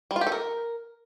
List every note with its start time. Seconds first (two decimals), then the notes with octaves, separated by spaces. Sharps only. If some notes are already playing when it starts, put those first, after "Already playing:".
0.11 G3
0.16 F4
0.21 G4
0.27 A4
0.32 A#4